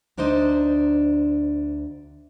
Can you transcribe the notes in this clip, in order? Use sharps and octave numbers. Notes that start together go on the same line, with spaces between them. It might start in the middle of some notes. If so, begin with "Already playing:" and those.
D2 D4 D#4 C5 D#5